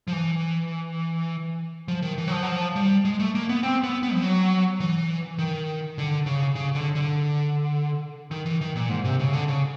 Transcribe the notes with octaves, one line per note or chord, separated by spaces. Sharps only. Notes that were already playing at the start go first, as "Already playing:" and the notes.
F3
E3
F3
D#3
E3
F#3
F3
F#3
F3
G3
G#3
A3
A#3
B3
C4
B3
B3
F3
F#3
E3
D#3
D3
C#3
C#3
D3
D3
D#3
E3
D#3
A#2
G#2
C3
C#3
D3
C#3